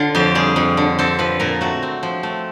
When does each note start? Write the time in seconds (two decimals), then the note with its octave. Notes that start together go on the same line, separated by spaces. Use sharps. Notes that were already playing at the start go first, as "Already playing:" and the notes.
Already playing: D3 F4
0.15 F2 G4
0.35 G3 G#4
0.56 F2
0.77 D3
0.99 C4 A4
1.19 F3 B4
1.40 A#2 A#4
1.61 A3 F#4
1.83 C4
2.03 F3
2.23 A3